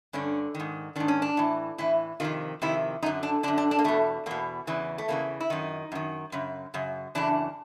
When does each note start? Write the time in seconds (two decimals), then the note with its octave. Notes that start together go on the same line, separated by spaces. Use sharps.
0.13 G2 D3 C#4
0.55 D#3
0.60 G#2
0.96 G#2 D#3 D4
1.08 C#4
1.22 D4
1.37 A2 E3
1.78 A2 E3 E4
2.20 F2 C3 D#3 F4
2.62 F2 C3 D#3 E4
3.03 F#2 D#4
3.06 D3
3.23 D4
3.43 D3 D4
3.48 F#2
3.58 D4
3.71 D4
3.79 A#3
3.84 E2 B2 A3
4.26 E2 B2 A#3
4.67 E2 C#3 E3
4.98 A3
5.08 E2 C#3 E3 A#3
5.40 E4
5.50 F#2 D#3 D#4
5.92 F#2 D#3
6.32 F#2 C#3
6.74 F#2 C#3
7.15 F#2 C#3 E3 D4